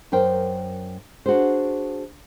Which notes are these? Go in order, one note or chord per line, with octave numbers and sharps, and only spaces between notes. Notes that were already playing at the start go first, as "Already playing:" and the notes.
F#2 A#4 C5 G5
D4 F#4 G#4 C5